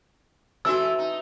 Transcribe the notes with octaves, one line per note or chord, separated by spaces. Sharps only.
E3 F#4 A4 E5 E6
D#4